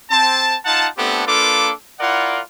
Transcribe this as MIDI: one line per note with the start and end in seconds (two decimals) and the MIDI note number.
0.11 0.55 60
0.11 0.55 81
0.65 0.87 63
0.65 0.87 65
0.65 0.87 78
0.65 0.87 81
0.98 1.24 57
0.98 1.24 59
0.98 1.24 60
0.98 1.24 62
0.98 1.24 67
0.98 1.24 69
1.26 1.70 58
1.26 1.70 62
1.26 1.70 65
1.26 1.70 69
1.26 1.70 71
1.26 1.70 86
1.99 2.40 64
1.99 2.40 65
1.99 2.40 70
1.99 2.40 74
1.99 2.40 78